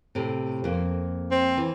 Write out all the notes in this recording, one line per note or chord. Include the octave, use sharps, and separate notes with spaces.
A2 C3
F2 A#3
C4
E3